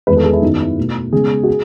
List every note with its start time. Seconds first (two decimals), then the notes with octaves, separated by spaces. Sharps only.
0.07 E2 D#3 G#3 B4
0.17 A4
0.24 G#4
0.33 E4
0.42 F#2 D#3 F#3 B3 D#4
0.60 E4
0.78 B2 A3
1.13 C#3 G#3 B3 G#4
1.43 F#4
1.48 G#4